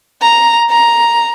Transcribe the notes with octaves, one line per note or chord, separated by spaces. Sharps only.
A#5
A#5